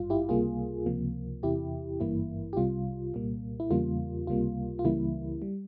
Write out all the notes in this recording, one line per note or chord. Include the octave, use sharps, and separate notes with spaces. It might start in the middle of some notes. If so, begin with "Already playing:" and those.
Already playing: G#1 G2 G3 F4
E4 G4
C#2 C3 G3 A#3 F4 G#4
C#2 C3 F3 A#3
E2 C3 E3 E4 G4
G#1 G2 E3 A#3 E4
G4
C2 C3 G3 F4
C2 A#2 G3 A#3
E4
E2 C#3 G3 A#3 F4
C#2 C3 G3 A#3 F4
F4
C#2 C#3 E3 G3 A#3 E4
G3